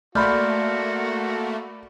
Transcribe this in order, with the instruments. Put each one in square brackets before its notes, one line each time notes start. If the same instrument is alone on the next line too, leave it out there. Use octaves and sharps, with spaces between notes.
[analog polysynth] A3 A#3 [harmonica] F#4 [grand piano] D5 B5 [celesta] C6 F6 G6